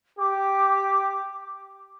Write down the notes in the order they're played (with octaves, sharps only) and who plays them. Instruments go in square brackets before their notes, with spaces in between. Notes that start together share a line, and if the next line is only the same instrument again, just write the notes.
[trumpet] G4 [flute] D6